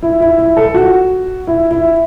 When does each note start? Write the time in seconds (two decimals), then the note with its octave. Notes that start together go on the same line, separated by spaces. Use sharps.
0.03 E4
0.20 E4
0.38 E4
0.57 A4
0.74 F#4
1.47 E4
1.71 E4